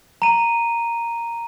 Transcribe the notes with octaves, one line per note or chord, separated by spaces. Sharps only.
A#5 D#7